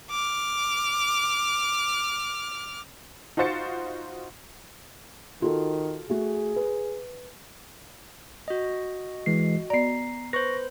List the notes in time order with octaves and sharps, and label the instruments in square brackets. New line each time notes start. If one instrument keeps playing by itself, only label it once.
[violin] D6 F6
[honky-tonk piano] D#4 F4 F#4 C5 A6 C#7
[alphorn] D#3 [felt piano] F4 F#4 A4
[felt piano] A3 F#4 [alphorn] G#4
[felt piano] B4
[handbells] F#4 D#5
[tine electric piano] E3 G#3 C7
[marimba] B3 D5 [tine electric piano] A#5 C7
[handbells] B4 C5 [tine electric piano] C#6 A#6